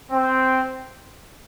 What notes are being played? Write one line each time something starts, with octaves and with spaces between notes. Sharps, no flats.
C4